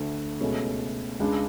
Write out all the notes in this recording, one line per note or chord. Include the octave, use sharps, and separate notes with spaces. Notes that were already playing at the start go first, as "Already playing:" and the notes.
Already playing: D2 D3 A3
C#2 B2 A3 C#4
C#2 C#3 G#3 D4